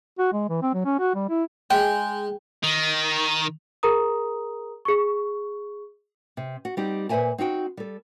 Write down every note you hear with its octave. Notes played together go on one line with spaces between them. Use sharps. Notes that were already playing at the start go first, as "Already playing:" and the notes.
F#4
G#3
E3
C4
F#3
C#4
F#4
G3
E4
G#3 G5
D#3
G#4 A#4 A#5 D#6
G#4 C#6
C3
F#4
G3 C4 D#4 G4
A#2 B4 C5 E5 G#5 A5
C4 D#4 F#4 G5
G3 A4